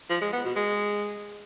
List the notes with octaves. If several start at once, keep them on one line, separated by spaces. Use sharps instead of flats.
F3
G#3
B3
B2
G#3